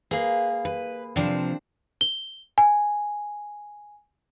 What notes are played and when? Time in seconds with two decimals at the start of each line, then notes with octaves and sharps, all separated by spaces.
0.11 A#3 G#4 B4
0.65 B4
1.16 C3 F3 C4 D4
2.01 G7
2.58 G#5